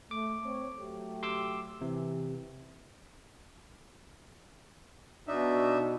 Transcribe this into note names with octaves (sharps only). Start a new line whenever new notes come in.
A3 D6
C4 C#5
F#3 A3 G4
C6 D6 E6
C3 E3
B2 D4 D#4 E5